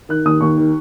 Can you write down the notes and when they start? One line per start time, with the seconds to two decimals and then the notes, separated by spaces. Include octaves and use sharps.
0.09 D#3 F#6
0.25 D#2 D#6
0.41 D#2 C#6
0.57 D#3